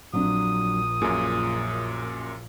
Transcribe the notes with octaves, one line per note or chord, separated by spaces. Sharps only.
A#1 F#3 C4 D4 D#6
F#2 A#2 G#4